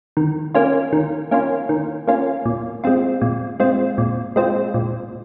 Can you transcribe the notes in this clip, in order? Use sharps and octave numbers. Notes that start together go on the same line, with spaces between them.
D#3
A#3 C#4 F4
D#3
A#3 C#4 F4
D#3
A#3 C#4 F4
A#2
G#3 C4 F4
A#2
G#3 C4 F4
A#2
G#3 C4 F4
A#2